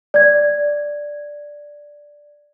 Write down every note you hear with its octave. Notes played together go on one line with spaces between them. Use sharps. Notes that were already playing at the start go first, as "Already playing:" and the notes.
D5 G#6